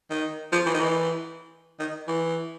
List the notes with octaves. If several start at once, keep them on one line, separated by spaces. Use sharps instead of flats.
D#3
F3
E3
D#3
E3
D#3
E3